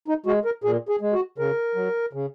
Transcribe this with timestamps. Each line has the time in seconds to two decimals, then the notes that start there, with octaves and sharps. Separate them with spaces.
0.08 D#4
0.26 G#3 F#4
0.45 A#4
0.64 A#2 G#4
0.89 G#4
1.01 G#3
1.13 F#4
1.38 C#3 A#4
1.75 F#3
2.13 C#3